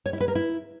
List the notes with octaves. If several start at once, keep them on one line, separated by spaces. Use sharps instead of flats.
C#5
E4
B4
A#4
E4